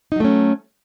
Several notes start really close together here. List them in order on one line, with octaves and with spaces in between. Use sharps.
D#4 F#3 A3 C#4